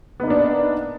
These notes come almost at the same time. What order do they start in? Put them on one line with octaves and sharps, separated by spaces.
B3 D#4 A#3 D4